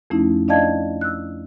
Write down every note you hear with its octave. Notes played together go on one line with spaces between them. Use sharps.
F2 F3 A3 C#4 D#4 E4
D4 D5 D#5 F5 A5 G#6
E6 F#6